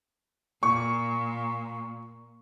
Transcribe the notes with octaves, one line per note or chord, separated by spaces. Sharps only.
A#2 C#6